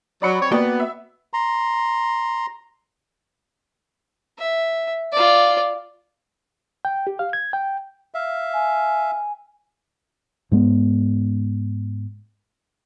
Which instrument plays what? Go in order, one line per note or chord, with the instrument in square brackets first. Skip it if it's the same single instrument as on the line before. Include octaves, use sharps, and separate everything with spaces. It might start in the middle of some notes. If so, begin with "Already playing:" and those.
[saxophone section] F#3 [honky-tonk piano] D5 B5 C#7
[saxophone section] C4 C#5
[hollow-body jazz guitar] A#3 F#4 G5 [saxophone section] B3 [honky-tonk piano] D5
[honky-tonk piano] E5
[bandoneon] A#5 C6
[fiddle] E5
F4 D5
[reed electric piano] G5
G4
F5
G#6
G5
[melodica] E5 F5
[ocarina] G#5
[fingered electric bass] G#2 G#3 B3